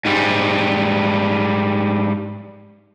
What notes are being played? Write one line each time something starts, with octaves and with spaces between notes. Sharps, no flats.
G#2 G3